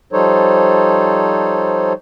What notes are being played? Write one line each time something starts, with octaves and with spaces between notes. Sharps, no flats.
F3 G3 D#4 A4 C5 C#5